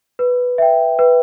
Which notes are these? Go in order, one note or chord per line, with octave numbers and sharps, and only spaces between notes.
B4
E5 G5
B4